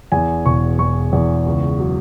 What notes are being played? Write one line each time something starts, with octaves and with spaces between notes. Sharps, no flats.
E2 G#5
E1 C#6
E2 C#6
E2
C#2
F#3